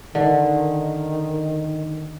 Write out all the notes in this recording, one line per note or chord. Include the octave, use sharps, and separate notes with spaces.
D3 D#3